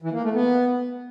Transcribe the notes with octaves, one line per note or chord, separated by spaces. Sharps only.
E3
A#3
A3
B3